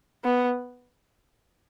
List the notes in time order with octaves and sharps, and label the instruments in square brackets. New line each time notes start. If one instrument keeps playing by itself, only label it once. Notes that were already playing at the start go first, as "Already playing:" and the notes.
[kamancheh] B3